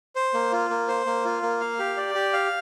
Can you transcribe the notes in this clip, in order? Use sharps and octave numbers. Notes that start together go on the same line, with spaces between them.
C5
A#3
F4
A#3
C5
A#3
F4
A#3
F5
G4
D5
G4
F5